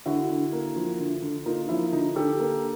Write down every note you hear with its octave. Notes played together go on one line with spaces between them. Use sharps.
D3 E4 F#4
D3
A#3
F3
D3
D3
A#3 D#4 F4
F3 E4
D3 D#4
D3 G4 A4
A#3